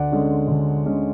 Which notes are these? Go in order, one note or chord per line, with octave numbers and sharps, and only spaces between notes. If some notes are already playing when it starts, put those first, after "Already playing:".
Already playing: D2 D5 F#5
D3 G#3 C#4
D2
D3 G#3 C#4